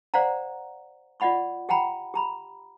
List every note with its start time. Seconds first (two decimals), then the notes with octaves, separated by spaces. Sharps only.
0.14 C5 D5 F5 F#5 A#5
1.20 F4 D5 D#5 F#5 B5 C#6
1.69 G4 F#5 G5 A#5 B5
2.14 G4 A#5 B5